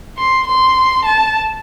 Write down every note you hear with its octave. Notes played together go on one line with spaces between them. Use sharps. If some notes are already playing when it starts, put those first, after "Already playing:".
C6
C6
A5